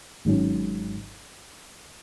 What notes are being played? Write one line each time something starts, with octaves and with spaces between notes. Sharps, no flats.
G#1 G#2 F#3 C#4